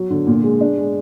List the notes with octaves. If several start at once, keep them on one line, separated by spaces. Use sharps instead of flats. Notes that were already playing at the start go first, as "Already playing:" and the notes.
Already playing: F#3
D3
A#2
G#3
D4
G#3